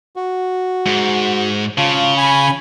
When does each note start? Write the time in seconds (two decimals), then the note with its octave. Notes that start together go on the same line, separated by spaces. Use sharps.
0.16 F#4
0.86 G#2
1.78 C#3 F4 A5
2.17 G#5 B5